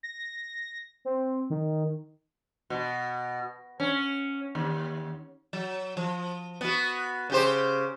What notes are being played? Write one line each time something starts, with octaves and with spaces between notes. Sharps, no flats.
A#6
C4
D#3
B2
C#4
D#2
F#3
F3
B3 F#4
C#3 G4 C5